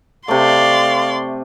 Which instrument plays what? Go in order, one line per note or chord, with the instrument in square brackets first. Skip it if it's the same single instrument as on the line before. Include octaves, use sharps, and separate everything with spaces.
[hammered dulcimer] C3 A3 [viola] D5 C6 [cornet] F5